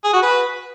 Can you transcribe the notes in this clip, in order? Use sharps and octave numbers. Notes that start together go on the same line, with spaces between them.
G#4
F#4
B4